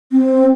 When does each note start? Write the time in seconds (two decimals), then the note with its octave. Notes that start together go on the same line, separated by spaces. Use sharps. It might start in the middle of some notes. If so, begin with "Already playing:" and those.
0.12 C4